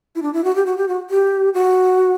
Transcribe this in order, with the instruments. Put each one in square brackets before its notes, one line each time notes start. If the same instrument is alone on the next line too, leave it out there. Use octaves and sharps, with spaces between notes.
[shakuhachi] E4
D4
E4
F#4
G4
F#4
G4
F#4
G4
F#4